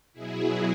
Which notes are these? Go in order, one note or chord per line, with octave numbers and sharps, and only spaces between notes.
B2 F#3 E4 G#4